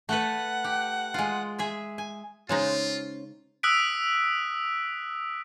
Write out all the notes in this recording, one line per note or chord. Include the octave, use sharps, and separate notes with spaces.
A3 A4 B4 F#5
G4
G#3 F4
G#4 E5 G#5
G#5
C#3 G#3 C#4 D#4 F4 C5
D#6 E6 F#6 B6 D7